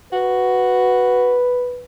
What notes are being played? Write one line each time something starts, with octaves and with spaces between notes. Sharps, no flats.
F#4 B4